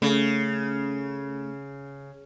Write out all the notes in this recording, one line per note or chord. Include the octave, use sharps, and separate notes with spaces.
C#3 A3